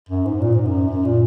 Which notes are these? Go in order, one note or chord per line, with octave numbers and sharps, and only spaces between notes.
F#2
G#2
A#2
G#2
F#2
F#2
A#2